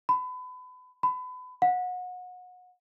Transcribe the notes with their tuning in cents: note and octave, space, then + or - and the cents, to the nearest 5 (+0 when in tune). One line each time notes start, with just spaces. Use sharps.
B5 +30
B5 +30
F#5 -30